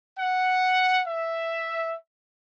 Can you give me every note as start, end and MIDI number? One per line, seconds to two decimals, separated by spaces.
0.20 1.03 78
1.08 1.95 76